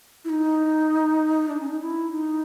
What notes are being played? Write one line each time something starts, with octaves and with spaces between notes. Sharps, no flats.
E4
D#4
D4
C#4
D#4
E4
D#4